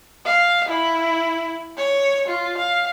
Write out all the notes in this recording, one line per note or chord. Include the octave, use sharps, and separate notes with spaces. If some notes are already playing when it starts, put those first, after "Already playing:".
F5
E4
C#5
F4
F5